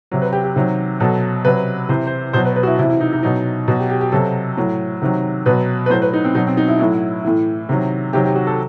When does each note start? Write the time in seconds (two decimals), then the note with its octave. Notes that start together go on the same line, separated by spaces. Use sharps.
0.11 C3 F#3
0.22 B4
0.33 G4
0.44 G4
0.56 C3 D#3 F#3
1.00 B2 F#3 A4
1.45 C3 F#3 B4
1.89 C3 E3 C5
2.07 C5
2.33 B2 F#3 C5
2.45 B4
2.56 B4
2.63 F#4
2.67 E4
2.79 C3 E4
2.82 E3
2.90 E4
3.01 D#4
3.12 D#4
3.23 B2 F#3 D#4
3.68 B2 F#3 F#4
3.79 G4
3.90 G4
4.01 G4
4.12 C3 F#3 A4
4.57 A2 F#3
5.02 C3 D#3 F#3
5.46 B2 F#3 B4
5.86 B4
5.90 A2 F#3 C5
6.02 B4
6.13 D#4
6.25 C4
6.35 B2 F#3 D#4
6.47 C4
6.57 D#4
6.68 E4
6.79 A2 F#3 E4
7.25 A2 E3
7.69 C3 D#3 F#3
8.13 C3 D#3 F#3 G4
8.24 G4
8.36 F#4
8.47 A4